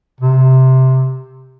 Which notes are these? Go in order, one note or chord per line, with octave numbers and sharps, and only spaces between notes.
C3